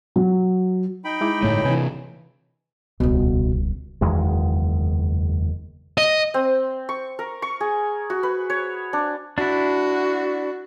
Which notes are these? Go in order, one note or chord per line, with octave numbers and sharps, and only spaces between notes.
F#3
D#4 G5 B5
G#3 E4 D6
G1 A2 A3 C#5
C3 E3 B4 G#5
D#1 C#2 B2
F#1 E2 D#3 G#3
D#5
C4
C#6
A#4
C#6
G#4
F#4
B4
C#5
D4
D4 E4 F#4